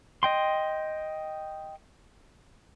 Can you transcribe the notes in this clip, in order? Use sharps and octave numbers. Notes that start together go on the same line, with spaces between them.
D#5 G5 C6